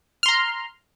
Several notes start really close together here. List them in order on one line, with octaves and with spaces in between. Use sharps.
F6 C6 A#5